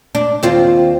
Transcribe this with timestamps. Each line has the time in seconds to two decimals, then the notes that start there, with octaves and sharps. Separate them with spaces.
0.15 D4
0.43 D#2 C4 F4